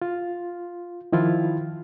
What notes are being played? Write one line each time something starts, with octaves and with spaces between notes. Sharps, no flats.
F4
D#3 F3 E4 F4